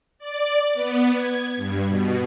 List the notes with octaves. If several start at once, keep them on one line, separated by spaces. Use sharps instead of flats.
D5
B3
G#6
G2
B2